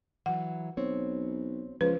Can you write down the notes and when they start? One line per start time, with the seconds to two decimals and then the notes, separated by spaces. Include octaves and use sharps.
0.26 E3 F#3 F#5
0.77 B1 C4 C#5
1.81 C#2 F3 B4